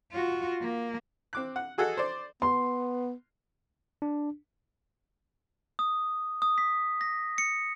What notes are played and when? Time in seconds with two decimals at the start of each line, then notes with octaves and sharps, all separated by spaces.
0.12 F4 F#4
0.61 A#3
1.33 C4 D6 F#6
1.56 F#5
1.78 F#4 G#4 A4 D#5 F#5
1.97 C5 D5
2.42 B3 C6
4.02 D4
5.79 D#6
6.42 D#6
6.58 B6
7.01 A#6
7.38 C#7